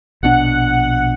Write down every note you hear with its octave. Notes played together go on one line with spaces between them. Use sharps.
A#1 B2 D4 F#5